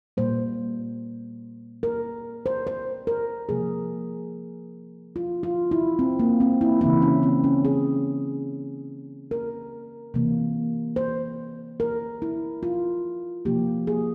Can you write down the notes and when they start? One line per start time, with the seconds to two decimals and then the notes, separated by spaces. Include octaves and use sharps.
0.17 A#2 G3 A#3 C5
1.83 A#4
2.46 C5
2.67 C5
3.07 A#4
3.49 C3 F3 A#3 G#4
5.16 F4
5.43 F4
5.71 E4
5.99 C4
6.20 A#3
6.40 C4
6.61 E4
6.81 C#3 E3 A#3 E4
7.02 C#4
7.23 C4
7.44 C#4
7.65 G#4
9.31 A#4
10.14 C3 E3 A#3
10.96 C5
11.80 A#4
12.22 E4
12.63 F4
13.45 C3 F3 A#3 G4
13.87 G#4